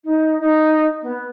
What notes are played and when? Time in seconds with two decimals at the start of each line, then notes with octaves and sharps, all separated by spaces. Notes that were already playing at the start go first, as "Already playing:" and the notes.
0.04 D#4
0.40 D#4
1.03 B3